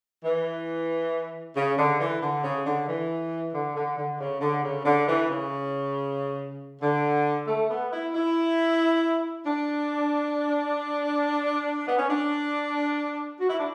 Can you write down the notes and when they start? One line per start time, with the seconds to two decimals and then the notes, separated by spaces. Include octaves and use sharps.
0.25 E3
1.56 C#3
1.78 D3
2.00 E3
2.22 D3
2.44 C#3
2.66 D3
2.88 E3
3.53 D3
3.75 D3
3.97 D3
4.20 C#3
4.41 D3
4.63 C#3
4.85 D3
5.07 E3
5.29 C#3
6.82 D3
7.47 A3
7.70 B3
7.92 E4
8.14 E4
9.45 D4
11.88 B3
11.98 C#4
12.08 D4
13.40 F#4
13.49 E4
13.59 D4